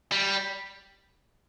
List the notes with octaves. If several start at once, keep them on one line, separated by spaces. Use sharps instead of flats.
G3